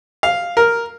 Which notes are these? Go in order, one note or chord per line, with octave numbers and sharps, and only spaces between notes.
F5
A#4